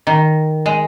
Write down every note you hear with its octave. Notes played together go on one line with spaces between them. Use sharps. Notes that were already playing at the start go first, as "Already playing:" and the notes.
D#3
G#3